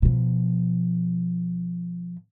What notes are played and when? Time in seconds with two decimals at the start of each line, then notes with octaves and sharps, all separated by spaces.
0.02 B2 F3